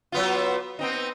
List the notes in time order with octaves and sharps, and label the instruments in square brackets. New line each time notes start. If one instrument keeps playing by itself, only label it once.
[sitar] F#3 B3 F4
B3 C4 D#4